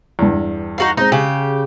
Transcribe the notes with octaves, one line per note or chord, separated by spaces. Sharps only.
E2 G2
D#4 F#4 F5
G#3 C4 D#4
C#3 G4 G#5